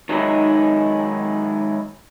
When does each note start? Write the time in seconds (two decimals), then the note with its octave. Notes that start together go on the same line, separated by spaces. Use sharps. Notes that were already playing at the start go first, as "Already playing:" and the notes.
0.09 D#3 F#3 G#3 D#4 E4